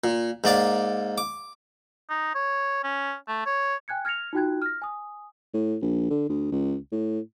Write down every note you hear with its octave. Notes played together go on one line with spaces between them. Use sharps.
A#2
G#2 A#3 D5 D6
D6
D#4
C#5
C#4
A3
C#5
G5 G#5 F#6 G#6 C#7
F6 G#6 A#6 C#7 F7
D#4 F4 F#4 G5 F#6 G#6
F6 A#6
G#5 D#6
A2
A#1
D3
D2
C#2
A2